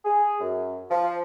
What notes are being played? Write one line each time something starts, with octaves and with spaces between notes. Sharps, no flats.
G#4
F#2
F3